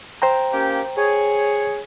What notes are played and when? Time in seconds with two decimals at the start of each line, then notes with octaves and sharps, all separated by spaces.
0.22 C5 G5 A#5
0.53 A#3 C#4 G4
0.97 G#4 C#5